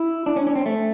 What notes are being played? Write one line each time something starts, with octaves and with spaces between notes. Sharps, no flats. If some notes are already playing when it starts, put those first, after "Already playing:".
Already playing: E4
D4
C#4
C#4
C4
A3